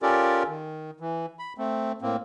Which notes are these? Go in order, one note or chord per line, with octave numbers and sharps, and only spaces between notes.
C#4 F4 G4 A4 A#4 D5
D#3
E3
B5
A3 C4
A2 A#3 C4